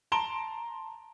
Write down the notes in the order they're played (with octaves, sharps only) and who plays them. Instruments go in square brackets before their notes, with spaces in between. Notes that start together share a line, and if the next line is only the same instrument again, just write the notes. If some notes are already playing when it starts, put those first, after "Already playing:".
[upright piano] A5 A#5 C6 D7 E7 G7